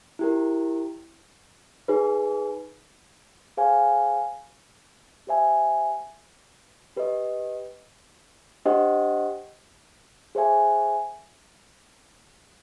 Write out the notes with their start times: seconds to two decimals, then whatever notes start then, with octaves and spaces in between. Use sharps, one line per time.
0.19 E4 G4 A#4
1.88 D#4 G#4 B4
3.57 G#4 C5 F5 G#5
5.27 G4 C5 E5 G#5
6.96 G4 B4 D#5
8.65 D4 G4 C5 D#5 F#5
10.35 G#4 C5 E5 G#5